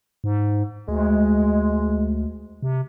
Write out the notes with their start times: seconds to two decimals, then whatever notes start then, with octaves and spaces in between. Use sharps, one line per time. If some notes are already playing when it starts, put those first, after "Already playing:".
0.24 G#2
0.89 D2 G#3
2.63 C3